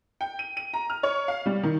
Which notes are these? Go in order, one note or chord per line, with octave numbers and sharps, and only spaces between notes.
G5
D#7
D#7
A#5
F6
C#5
F5
G3
D#3